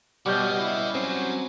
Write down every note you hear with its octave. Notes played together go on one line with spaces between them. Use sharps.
B2 G3 C#4 F#4 D#5 D6 F6 G6
E4
F#3 C4 C#4 C5